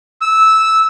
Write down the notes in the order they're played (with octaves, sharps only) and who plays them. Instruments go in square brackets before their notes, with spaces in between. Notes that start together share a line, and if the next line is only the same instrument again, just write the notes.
[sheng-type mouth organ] E6